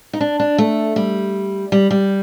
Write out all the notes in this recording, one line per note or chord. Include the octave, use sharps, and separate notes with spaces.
D#4
D4
D4
A3
G3
G3
G3